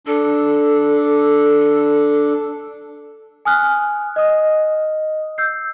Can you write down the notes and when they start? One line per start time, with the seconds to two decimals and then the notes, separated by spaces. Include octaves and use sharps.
0.07 D4 A4
3.45 G#5 D#6 F6 F#6
4.16 D#5 D#6
5.38 E6 G6 C7